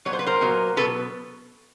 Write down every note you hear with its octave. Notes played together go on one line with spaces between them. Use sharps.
A#2 F#3 B3 C#5
C5
B4
A#4 C5
A#2 F#3 B3
B2 F#3 B3 A4 B4